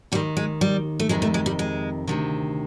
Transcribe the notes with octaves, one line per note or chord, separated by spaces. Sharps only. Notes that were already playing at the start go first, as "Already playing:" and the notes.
D#2 D#3 G3
G#3
G3
A3
F2 C3 D#3 G#3
A3
G#3
G3
G#3
D2 C3 D#3